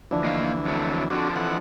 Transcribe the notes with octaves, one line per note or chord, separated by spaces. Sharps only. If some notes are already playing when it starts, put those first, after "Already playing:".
D2 E3 F3 D4
A#3 D#5 F5
F2 F#3 A3
F2 D3 F3 D4 F#4
E3 F#5